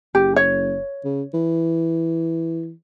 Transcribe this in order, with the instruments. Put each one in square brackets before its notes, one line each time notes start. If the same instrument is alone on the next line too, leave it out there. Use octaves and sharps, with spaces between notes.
[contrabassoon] F#1 [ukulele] G4
[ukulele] C#5
[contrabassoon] C#3
E3